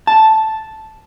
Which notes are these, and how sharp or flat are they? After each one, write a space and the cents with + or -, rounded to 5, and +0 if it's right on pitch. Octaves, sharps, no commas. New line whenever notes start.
A5 -5